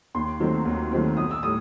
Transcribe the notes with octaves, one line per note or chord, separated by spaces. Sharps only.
D#2 C6
D#3 F#3 A3 C4
D#2
D#3 F#3 A3 C4
B1 D#6
E6
A2 G3 D#6